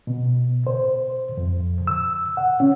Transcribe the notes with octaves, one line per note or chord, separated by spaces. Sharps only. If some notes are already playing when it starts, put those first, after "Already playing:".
B2
C5
F2
E6
F#5
C#4